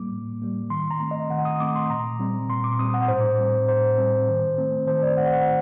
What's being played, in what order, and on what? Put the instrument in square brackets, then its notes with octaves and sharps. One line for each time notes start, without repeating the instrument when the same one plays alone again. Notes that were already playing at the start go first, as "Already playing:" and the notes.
Already playing: [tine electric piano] A2 G3 A#3 D6
A2
G3 A#3
D#3 C6
A#5
A3 C4
D#5
D#3 F#5
D#6
A3 C4 D6
C6
A#2 A#5
G3 C4
A#2 C6
D6
G3 C4 D#6
F#5
A2 C5
G3 C4
A2 C5
G3 C4
D#3
A3 C4
D#3 C5
D5
A3 C4 F#5
F#5